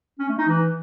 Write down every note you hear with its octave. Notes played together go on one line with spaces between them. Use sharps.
C#4
A3
D#4
E3